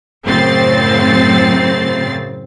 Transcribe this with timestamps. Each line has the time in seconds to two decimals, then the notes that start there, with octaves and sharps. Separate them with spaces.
0.25 F#2 A2 C#3 C4 A6 C7